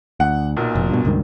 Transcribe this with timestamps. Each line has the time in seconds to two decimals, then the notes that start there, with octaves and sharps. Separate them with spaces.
0.20 D2 F#5
0.57 B1 A#2
0.75 F1
0.90 G2 B2
1.05 C#2 G2 D#3